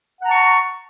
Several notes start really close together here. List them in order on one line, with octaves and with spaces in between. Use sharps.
F#5 A#5 A5 C#6